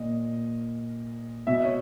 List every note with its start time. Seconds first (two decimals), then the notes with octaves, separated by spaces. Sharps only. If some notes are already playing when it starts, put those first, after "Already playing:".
Already playing: A#2 D#5
1.47 B2 E5
1.65 C#5